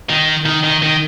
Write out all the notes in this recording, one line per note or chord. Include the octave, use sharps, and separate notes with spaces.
D#3
D#3
D#3
D#3